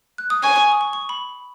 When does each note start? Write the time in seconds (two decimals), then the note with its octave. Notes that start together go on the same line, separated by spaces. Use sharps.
0.18 F#6
0.30 D#6
0.43 G#5 C#6
0.56 C#6
0.72 D#6
0.81 C#6
0.93 C#6
1.09 B5